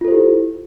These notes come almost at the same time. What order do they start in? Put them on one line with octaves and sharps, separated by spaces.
F4 A4 C5 G4 E4